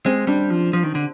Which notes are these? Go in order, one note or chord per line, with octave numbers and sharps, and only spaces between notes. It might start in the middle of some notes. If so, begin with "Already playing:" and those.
G#3 C4
G3 D4
F3
F3
D#3
D3